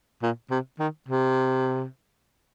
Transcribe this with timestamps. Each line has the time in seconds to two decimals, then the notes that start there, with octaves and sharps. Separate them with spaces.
0.22 A#2
0.51 C3
0.79 D#3
1.08 C3